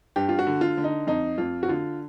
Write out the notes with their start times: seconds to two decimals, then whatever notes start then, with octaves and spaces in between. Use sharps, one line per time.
0.16 G2 G4
0.29 F4
0.39 F#4
0.47 D3
0.61 F4
0.78 D3
0.84 D#4
1.07 F2 D#4
1.38 F2 F4
1.63 F#4
1.69 D3 F4